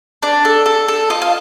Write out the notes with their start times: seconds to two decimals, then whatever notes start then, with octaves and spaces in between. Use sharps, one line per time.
0.23 D4 D5
0.45 A4
0.66 A4
0.88 A4
1.10 F4 D#5
1.22 F5